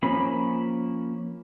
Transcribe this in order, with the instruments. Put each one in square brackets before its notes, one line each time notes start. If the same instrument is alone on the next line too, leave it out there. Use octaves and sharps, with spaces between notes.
[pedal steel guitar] F3 A#3 C#4 B5